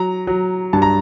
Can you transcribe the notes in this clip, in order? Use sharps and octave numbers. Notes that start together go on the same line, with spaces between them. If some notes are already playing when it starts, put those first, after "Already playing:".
Already playing: F#3 A#5
F#3
G2 A5
A#5